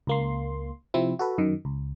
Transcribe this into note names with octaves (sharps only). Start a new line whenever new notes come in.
C#2 A#3 C6
C3 F3 C4 E4
F#4 A4 B4
F#2 D#3
C#2